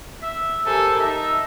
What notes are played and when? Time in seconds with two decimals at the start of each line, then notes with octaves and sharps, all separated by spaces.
0.22 E5
0.66 G4 A4 A#4 C5 G#5
1.00 D#4 E5 A5